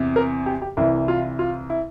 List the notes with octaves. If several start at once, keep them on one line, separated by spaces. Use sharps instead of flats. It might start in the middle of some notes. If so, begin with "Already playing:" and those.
Already playing: E2 C3
A#4
G4
G4
C2 C3 E3 E4
F4
F4
E4